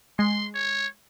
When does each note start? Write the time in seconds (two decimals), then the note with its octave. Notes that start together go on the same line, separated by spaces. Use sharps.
0.19 G#3 C6
0.55 C#5